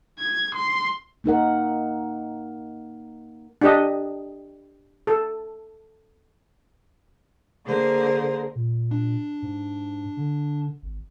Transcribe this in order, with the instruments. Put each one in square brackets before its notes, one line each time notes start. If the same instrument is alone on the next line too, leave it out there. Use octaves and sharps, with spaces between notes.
[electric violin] G#6
C6
[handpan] A#3 D#4 A#4 F#5
[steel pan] D4 G4 D#5
A4
[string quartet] D3 A#3 G#4 A#4 C5
[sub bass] A#2
[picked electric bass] D4
[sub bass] G#2
D3
G#1